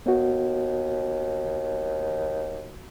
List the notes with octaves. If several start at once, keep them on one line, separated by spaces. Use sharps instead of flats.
D#2 B3 F#4